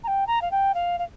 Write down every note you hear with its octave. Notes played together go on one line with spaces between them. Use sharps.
A#5
G5
A#5
F5
G5
F5
F5